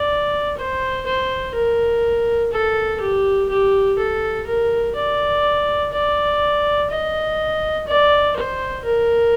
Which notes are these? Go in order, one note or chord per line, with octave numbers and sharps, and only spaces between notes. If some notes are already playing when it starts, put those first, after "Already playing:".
Already playing: D5
C5
C5
A#4
A4
G4
G4
A4
A#4
D5
D5
D#5
D5
C5
A#4